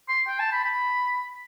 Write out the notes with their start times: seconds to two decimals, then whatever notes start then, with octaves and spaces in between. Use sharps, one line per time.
0.09 C6
0.28 G5
0.40 A5
0.52 B5
0.64 B5